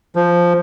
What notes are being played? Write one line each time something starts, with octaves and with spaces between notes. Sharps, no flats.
F3